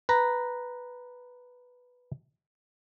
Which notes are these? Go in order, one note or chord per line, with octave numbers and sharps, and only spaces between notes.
B4 A#5